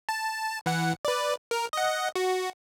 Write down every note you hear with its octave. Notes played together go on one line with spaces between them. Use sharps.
A5
E3 F#5
B4 D5
A#4
D#5 F#5
F#4